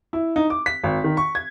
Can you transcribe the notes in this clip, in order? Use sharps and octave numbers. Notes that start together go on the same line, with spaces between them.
E4
D#4
D6
B6
G#1
D#3
C#6
G#6